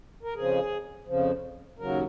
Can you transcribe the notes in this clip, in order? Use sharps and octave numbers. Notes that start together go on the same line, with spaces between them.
A#4
F2 C#3 F3 G#4
F2 C#3 F3
D#2 C#3 F#3 A#4